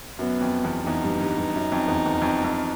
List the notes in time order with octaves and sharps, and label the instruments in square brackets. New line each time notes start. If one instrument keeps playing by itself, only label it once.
[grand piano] F#2 [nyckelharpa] B3
[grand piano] F2
E2
[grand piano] E2 [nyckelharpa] D#4
[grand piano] G2
G2
G2
F#2
F2
E2
E2
F2
F2